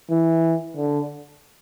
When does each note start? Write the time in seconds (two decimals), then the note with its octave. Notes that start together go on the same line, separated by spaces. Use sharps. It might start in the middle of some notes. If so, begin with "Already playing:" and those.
0.10 E3
0.77 D3